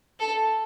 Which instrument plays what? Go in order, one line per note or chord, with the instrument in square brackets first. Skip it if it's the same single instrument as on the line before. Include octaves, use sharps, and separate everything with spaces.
[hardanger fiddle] A4